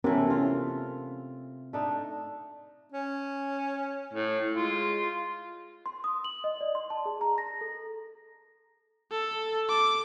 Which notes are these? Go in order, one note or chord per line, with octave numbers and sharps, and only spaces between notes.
C3 E3 A3 B3 C#4 A#4
C#4 F4
A3 D4 D#4
C#4
A2
G#3 F4
C6
D#6
F#7
D#5
D5
C6
A5
G#4
A#5
A#6
A4
A4
D6